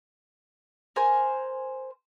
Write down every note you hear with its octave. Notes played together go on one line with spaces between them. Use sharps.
A#4 C5 G#5